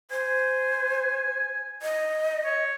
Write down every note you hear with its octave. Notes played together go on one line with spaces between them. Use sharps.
C5 G#5
D#5
C#5